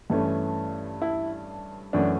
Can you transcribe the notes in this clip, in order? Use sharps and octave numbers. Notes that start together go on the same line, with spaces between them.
G2 E3 A3 C#4
E4
F#2 E3 A3 C#4 D4